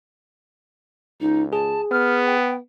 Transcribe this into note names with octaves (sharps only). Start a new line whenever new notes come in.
C#2 D#4
G#4 A5
B3 F6
G5